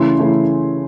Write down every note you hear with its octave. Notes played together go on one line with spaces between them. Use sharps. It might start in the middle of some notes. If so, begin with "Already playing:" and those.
Already playing: C#3 E3 A3 C#4 E4 C6
C#3 E3 A3 C#4 E4